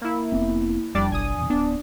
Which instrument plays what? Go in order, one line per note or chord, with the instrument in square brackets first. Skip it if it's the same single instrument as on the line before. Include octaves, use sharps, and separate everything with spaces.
[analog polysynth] A#3 E4
[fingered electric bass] F1 B3 C4
[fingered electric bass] E1 F2 [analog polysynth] G3 D4 D5
[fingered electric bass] F#1 B1 [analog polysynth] G#5 D#6
[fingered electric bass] E2 B2
[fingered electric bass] D1 B3 [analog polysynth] D4